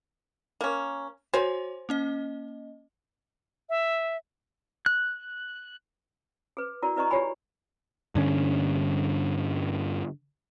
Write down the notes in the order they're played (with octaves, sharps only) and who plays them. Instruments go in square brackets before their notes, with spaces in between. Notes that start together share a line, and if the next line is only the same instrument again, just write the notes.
[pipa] A#3 C#4
[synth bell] F#4 C#5 [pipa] C5 G#5
[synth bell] A#3 C#4 D#5
[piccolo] E5
[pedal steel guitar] F#6
[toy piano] G#4 B4
E4 F#4 A#4 D5
E4 B4 D5 D#5 A#5 C#6
F4 G4 C#5 D5 G#5 B5
[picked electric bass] G2 D3 C#4